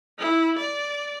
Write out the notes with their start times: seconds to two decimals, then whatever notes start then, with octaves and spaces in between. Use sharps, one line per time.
0.19 E4
0.59 D5